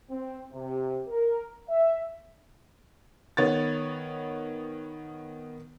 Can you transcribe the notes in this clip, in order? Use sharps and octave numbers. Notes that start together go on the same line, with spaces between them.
C4
C3
A#4
E5
D#3 B3 C#5 A6